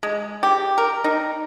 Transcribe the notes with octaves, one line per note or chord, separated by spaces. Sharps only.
G#3
G4
A#4
D#4